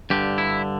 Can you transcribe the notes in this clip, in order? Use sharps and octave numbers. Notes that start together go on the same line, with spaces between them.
G2 D3 G4
E4